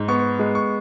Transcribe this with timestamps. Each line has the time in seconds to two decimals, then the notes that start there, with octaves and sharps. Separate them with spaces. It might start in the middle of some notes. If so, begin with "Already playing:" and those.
Already playing: G#2
0.08 B3 C#6
0.39 G#3
0.55 C#6